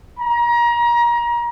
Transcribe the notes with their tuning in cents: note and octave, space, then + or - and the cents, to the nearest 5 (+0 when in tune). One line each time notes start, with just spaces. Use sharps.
A#5 +30